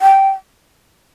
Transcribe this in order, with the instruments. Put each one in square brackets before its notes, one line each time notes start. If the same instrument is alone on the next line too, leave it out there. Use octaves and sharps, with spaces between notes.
[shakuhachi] G5